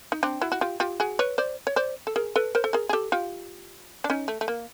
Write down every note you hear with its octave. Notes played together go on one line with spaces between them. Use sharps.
D#4
C4 D4
E4 F#4
F#4
F4 G4
F4 G4
F#4 G#4
B4 C#5
C5 D5
C#5
C5 D5
A4
G#4 A#4
A4 B4
A#4 C5
A4
G#4 A#4
G#4
G4 A4
F4 G4
D4
C#4 D#4
A3
A3
A#3